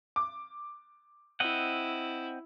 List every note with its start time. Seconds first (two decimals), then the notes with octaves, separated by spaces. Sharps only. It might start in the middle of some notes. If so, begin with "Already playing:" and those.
0.16 D6
1.40 C4 E4 D#5 F#5